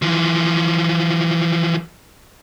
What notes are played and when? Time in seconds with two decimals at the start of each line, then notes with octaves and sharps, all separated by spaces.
0.02 E3 F3